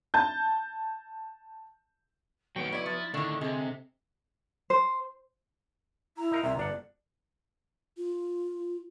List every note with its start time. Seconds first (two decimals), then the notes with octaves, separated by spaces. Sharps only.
0.14 A5 G6
2.56 D#2 F#3 B3 G5 D7
2.72 E4 C#5 D5
2.86 F3 A6
3.14 A2 D3 D#3 D4 E4 C#6
3.41 C3 G#3 G#5
4.70 C5
6.17 E4 A#5
6.31 D#4 A#4 F5
6.43 C2 C3 E5
6.57 G1 D4 D5 F#5
7.97 F4